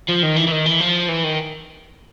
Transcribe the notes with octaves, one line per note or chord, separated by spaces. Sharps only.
F3
D#3
E3
E3
D#3
E3
F3
E3
D#3